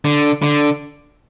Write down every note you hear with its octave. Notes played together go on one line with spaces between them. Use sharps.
D3
D3